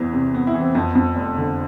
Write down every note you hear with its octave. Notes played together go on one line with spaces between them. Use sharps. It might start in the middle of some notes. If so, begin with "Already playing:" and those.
Already playing: E2 C3 E3 B3
C3
B3
E4
E3
C4
F2 B3
F2
F1
D3